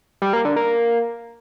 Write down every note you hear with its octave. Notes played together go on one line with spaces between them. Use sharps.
G3
A#3
D3
A#3